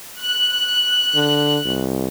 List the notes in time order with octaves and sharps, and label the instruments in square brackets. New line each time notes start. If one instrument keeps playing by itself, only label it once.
[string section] F#6
[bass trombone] D3
C2